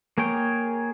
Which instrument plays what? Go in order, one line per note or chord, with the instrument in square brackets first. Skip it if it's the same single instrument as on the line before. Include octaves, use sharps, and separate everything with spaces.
[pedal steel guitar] A#3 G#4 C#5 G5